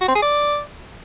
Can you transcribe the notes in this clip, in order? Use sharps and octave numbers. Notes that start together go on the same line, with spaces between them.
F#4
C4
G#4
D5